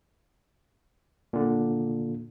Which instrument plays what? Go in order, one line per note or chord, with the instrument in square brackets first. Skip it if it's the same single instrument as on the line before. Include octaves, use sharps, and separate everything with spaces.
[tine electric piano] A#2 D3